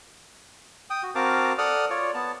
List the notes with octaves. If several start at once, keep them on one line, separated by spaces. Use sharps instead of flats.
G5 D#6
F#4
C4 F#4 A#4 F5 A5 D6
A4 D5 F#5 D#6 F6
F4 C#5 D5
B3 A5